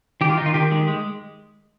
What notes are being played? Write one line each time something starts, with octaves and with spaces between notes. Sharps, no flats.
D#3 G4
F4
D#3 D#4
F4
D#3 G4
G#3
G#3